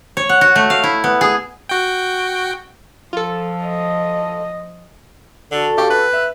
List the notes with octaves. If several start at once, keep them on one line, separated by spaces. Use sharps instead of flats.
C#5
F#5
F#4
A3
F5
E4
B3
G#4
F#4 G5
F3 F4 A4
D#5
D3 D4 F#4 A4
G4 F5 G5 C#6
B4
E5